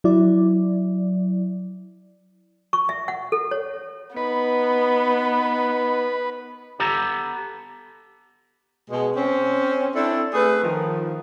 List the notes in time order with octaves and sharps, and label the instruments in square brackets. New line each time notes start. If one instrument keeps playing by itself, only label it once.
[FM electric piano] F#3 E4 D5
[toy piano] C#6
E5
F#5
A4
C#5
[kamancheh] B3 [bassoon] D#4 [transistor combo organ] B4 [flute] B5
[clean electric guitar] B3 G4 A4 A#5
[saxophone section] B2 G#3
C4 C#4
C4 D4 E4 A4
A3 G#4 B4
D#3 F3